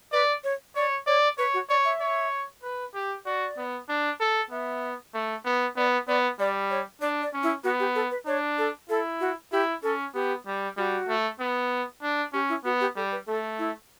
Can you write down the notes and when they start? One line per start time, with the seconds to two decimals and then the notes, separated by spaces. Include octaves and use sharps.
0.12 B4 D5
0.44 C#5
0.76 C#5 D5
1.07 C#5 D5
1.38 B4 C#5
1.54 F#4
1.69 C#5 D5
1.85 E5
2.00 C#5
2.63 B4
2.94 G4
3.25 F#4 D5
3.57 B3
3.89 D4
4.20 A4
4.50 B3 E5
5.14 A3
5.45 B3
5.76 B3 D5
6.08 B3 D5
6.39 G3 D5
6.70 C#5
7.01 D4 D5
7.22 D5
7.33 C#4
7.43 E4
7.64 B3 F#4
7.80 G4
7.95 A4
8.11 B4
8.26 D4 C#5
8.58 A4
8.89 E4 A4
9.20 F#4
9.52 E4 G4
9.83 C#4 A4
10.14 B3 G4
10.46 G3
10.77 G3 F#4
11.08 A3
11.39 B3
12.02 D4
12.33 C#4 G4
12.49 E4
12.64 B3 F#4
12.81 G4
12.96 G3 A4
13.12 B4
13.27 A3 A4
13.59 E4